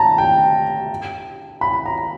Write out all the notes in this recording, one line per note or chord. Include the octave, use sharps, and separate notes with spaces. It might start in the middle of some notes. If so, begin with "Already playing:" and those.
Already playing: A5 A#5
G5
B5
A#5